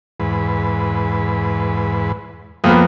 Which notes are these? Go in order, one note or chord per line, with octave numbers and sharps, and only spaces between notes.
E2 G#2 B4
F2 A#3 B3